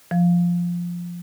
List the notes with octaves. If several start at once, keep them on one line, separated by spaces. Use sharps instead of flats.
F3